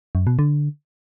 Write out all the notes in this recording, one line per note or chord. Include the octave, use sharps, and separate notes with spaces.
F#2
B2
D3